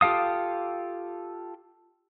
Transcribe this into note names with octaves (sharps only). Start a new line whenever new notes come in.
F4 G4 A4 F5 D#6